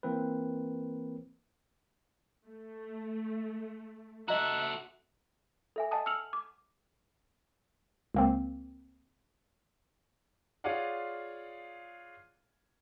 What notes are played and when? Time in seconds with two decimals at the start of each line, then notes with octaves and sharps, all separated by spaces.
0.03 E3 A#3 C4 A#4 B4
2.46 A3
4.28 F#4 A4 D#5 E5 A#5 F#6
5.76 A4 E5 G#5
5.91 D#5 F#5 G#5 A5 D#6
6.06 E6 F6 C#7 F7 F#7
6.33 D6
8.15 C#2 A#3 C4
10.64 F4 G#4 C#5 D5 F5 F#5